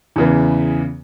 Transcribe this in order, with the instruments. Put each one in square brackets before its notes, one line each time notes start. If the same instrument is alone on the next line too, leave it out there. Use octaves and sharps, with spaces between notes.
[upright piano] E2 C#3 E3 B3